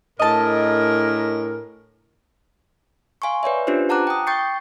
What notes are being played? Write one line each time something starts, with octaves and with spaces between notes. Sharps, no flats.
A2 D4 G#4 A#4 D#5 A5
F5 G#5 C6 C#6
B4 C#5 D5 E5
C#4 D4 F4 G4 B4 C5
F#5 A5 A#5 D6 F#6
G5 D#6
G5 C#6 G6 A6 C7 C#7